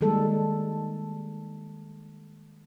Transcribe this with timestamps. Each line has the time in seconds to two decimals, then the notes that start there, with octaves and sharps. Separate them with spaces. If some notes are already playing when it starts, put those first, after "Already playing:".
0.01 D#3 G3 G#3 A#3 A4